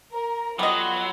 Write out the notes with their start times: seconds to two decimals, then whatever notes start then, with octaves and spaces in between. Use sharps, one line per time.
0.13 A#4 A#5
0.59 F#3 G3 B3 F4 A4 D#5 B5